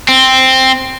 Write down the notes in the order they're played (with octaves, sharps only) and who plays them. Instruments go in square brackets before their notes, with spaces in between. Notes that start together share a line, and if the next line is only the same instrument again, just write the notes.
[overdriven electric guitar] C4